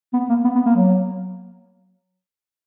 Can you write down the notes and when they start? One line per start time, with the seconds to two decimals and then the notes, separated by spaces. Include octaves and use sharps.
0.13 B3
0.29 A#3
0.44 B3
0.55 B3
0.66 A#3
0.75 F#3